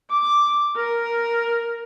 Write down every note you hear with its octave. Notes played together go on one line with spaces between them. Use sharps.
D6
A#4